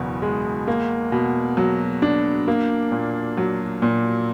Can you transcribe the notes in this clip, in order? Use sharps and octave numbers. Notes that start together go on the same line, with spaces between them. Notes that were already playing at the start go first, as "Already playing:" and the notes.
Already playing: F#1 E2 B2
G#3
A#3
B2
F#3
D4
A#3
A#2
F#3
A#2